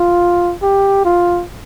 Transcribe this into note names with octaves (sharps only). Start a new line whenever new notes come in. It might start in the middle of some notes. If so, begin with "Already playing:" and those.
Already playing: F4
G4
F4